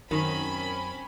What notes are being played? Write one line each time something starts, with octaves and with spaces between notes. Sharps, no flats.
F#2 D#3 C4 C#4 B5